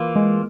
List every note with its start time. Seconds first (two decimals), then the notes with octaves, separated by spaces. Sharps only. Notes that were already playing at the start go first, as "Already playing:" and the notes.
Already playing: E3 A#3 F4
0.16 G#3